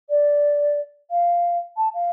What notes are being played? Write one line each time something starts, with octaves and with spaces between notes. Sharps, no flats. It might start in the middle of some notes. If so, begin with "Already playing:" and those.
D5
F5
A5
F5